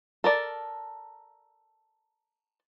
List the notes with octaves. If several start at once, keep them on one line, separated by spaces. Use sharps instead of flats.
A4 A#4 D5